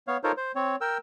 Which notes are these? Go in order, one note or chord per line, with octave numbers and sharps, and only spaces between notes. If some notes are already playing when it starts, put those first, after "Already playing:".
B3 C#5 F5
D#4 F4 A4 A#4 C5 C#5
C5
C4 C#5
A#4 G5 E6